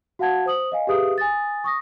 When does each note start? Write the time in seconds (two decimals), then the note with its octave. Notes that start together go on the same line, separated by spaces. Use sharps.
0.19 F#4 F5 F#5 A5 G#6
0.46 C5 D#6 F#7
0.72 D#5 F5 G#5
0.87 G4 G#4 B4 E5 F5 D#6
1.18 G#5 D#6 A6
1.64 C#6 D#6 A#6